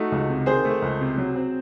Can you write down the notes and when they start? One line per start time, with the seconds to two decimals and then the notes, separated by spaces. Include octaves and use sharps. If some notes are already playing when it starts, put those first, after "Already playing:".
Already playing: A3 D#4 F#4
0.12 C#2
0.29 C3
0.46 D#3 G#4 C5
0.65 A3
0.82 C#2
1.00 C3
1.18 F#3
1.36 C4